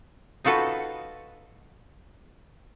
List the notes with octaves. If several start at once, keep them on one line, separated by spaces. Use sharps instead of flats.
D#4 F4 F#4 A4 B4